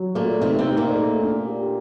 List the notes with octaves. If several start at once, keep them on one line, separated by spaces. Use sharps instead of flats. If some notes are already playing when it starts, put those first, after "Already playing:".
Already playing: F#3
A#2 A3 A#3
C3 C4 D#4
C3 C4
D#4
A#2 A#3
A3
D4
G4